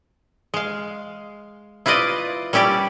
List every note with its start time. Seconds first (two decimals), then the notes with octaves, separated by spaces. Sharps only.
0.54 G#3 F5
1.86 E4 F4 B4 D5 D#5
2.53 G3 C#4 E4 G4 D5